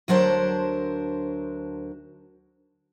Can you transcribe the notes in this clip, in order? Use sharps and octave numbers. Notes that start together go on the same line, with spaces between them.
D2 F#3 D4 A#4 C5 A5